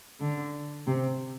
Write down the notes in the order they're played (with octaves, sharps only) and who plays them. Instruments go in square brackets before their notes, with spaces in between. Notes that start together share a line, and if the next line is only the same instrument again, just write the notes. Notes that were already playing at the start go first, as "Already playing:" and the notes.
[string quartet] D3
C3